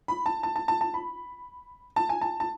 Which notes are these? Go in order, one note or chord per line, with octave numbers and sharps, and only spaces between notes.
B5
A5
A5
A5
A5
A5
B5
A5
G#5
A5
A5